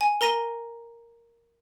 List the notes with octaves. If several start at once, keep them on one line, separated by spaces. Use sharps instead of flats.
G#5
A#4 A#5 A#6 D#7 G7